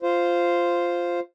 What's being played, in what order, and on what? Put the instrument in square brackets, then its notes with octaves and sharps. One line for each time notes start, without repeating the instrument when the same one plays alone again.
[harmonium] F4 C5